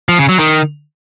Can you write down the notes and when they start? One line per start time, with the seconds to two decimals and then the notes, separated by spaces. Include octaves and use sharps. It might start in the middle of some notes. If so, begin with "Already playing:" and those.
0.09 F3
0.19 C#3
0.29 F#3
0.39 D#3